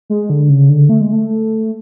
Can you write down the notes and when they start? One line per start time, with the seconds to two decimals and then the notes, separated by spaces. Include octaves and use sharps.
0.10 G#3
0.30 D3
0.49 C#3
0.69 D3
0.89 A3
1.01 G#3
1.13 A3